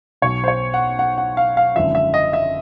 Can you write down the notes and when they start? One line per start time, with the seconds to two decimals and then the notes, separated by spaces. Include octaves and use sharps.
0.22 B1 B2 C#5
0.44 C5
0.48 C#5
0.74 F#5
0.99 F#5
1.18 F#5
1.37 F5
1.57 F5
1.76 G#1 F#2 D3 F3 E5
1.95 E5
2.14 D#5
2.33 E5